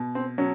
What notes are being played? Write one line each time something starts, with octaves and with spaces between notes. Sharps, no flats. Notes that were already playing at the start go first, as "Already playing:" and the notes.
Already playing: B2
C4
F#3 C#4